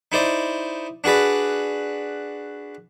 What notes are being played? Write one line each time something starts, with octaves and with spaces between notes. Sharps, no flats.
D#4 E4 C5 D5
D4 F#4 G#4 B4 D5